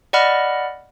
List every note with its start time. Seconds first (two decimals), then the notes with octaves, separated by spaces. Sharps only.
0.13 D5 D#5 F#5 B5 F6